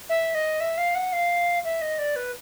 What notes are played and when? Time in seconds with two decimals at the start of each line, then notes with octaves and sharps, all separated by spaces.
0.09 E5
0.35 D#5
0.60 E5
0.78 F5
0.95 F#5
1.13 F5
1.64 E5
1.82 D#5
1.99 D5
2.16 B4